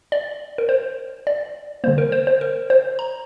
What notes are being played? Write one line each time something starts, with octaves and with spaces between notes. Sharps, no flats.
D5
A#4
C5
D5
D3 G3 A#3 C5
A#4
C5
C5
A#4
C5
A#5